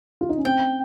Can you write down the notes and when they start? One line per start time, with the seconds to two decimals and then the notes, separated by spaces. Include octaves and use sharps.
0.21 F4
0.29 D#4
0.38 C#4
0.45 C4 G5